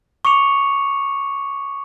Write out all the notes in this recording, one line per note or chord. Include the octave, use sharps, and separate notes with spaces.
C#6 D6 C#7 F7